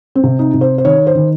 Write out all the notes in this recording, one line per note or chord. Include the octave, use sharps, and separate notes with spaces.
C4
C3
D#4
C3
C5
C5
D#3 C#5
C5
D#3